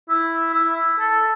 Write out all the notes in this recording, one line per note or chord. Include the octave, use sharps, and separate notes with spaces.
E4
E4
A4